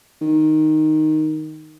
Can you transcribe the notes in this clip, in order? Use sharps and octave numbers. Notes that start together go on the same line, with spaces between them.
D#3